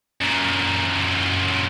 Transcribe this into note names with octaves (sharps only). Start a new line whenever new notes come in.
F#2 A#2